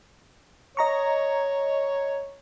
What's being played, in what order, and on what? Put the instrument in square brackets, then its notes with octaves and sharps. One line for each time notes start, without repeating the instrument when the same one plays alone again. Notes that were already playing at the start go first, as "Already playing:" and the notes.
[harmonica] C#5 [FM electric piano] D#5 A#5 C#6